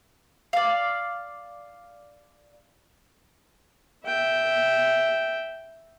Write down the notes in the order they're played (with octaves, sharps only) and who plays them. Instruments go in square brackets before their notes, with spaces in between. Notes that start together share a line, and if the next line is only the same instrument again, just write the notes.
[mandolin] D5 F5
[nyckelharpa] E5 G5